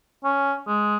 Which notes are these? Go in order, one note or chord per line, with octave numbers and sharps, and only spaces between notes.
C#4
G#3